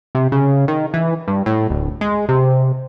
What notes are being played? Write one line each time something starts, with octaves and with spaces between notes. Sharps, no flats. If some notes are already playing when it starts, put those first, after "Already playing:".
C3
C#3
D#3
E3
G2
A2
D1
G#3
C3